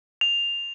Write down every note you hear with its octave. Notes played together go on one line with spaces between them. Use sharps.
F7